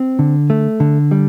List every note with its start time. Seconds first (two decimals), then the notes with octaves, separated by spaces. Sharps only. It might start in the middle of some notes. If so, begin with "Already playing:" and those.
Already playing: C4
0.19 D3
0.50 A3
0.80 D3
1.11 G3